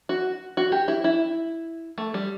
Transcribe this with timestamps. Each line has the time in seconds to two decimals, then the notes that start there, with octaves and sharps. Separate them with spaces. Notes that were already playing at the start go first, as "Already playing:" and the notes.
0.09 F#4
0.57 F#4
0.72 G4
0.88 E4
1.04 E4
1.98 A3
2.14 G3